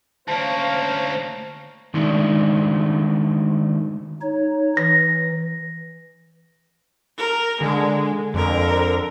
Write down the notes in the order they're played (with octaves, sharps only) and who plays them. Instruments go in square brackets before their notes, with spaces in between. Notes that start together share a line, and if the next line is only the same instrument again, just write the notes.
[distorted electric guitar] D2 A#3 [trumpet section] C#4 C5 F5 [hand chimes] A5
[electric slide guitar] D#3 G#3 A3 D4 D#4
[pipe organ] D#4 C#5
[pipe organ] E3 [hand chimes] A#6
[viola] A#4
[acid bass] D3 [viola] G#3
[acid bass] F2 [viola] D3 A#4